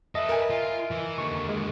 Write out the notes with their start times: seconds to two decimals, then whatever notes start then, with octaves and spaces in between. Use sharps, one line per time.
0.15 A4 B4 D#5 E5
0.29 A#4 G#5
0.50 F4
0.91 E3
1.18 D#2 D3 C#6
1.49 G#3